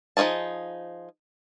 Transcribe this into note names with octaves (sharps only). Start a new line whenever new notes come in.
F3 D#4 F4 G#4 A5